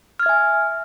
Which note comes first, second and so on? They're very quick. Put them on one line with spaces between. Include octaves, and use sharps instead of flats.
F6 G#6 E5 G#5